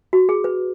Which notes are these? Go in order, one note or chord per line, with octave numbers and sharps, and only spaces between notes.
F#4
G#4
B4